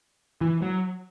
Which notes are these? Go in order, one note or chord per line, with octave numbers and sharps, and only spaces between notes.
E3
F#3